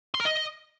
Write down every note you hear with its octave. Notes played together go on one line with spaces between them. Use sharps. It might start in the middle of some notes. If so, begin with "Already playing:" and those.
C6
A#4
D#5